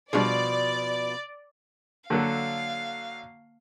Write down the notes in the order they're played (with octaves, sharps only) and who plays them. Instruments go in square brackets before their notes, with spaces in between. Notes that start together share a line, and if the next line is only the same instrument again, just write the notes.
[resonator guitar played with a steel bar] B2 F3 [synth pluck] G3 D4 G#4 [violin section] D5
[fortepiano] D3 F#3 A4 [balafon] A#3 [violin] F5